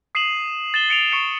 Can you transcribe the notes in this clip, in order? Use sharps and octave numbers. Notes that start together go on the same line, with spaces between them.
D#6 C7 D#7 E7 F#7
A6 E7 G7
A6 C#7 D7 F7
C#6 C#7 D7